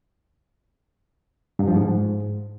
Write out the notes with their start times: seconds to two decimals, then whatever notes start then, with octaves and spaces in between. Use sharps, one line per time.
1.59 G2
1.67 F3
1.76 G#2